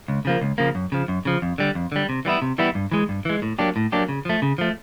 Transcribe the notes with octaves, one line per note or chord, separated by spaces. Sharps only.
C#2
C#3 F3 A#3
C#2
C#3 F3 A#3
F#2
C#3 F3
F#2
C#3 F3
F2
D3 G3
F2
D3 G3
C3
E3 G3 B3 E4
C3
E3 G3 B3 E4
G2
E3 G#3
G2
E3 G#3
A2
F#3 A#3 D4 G4
A2
F#3 A#3 D4 G4
C#3
F3 A3
C#3
F3 A3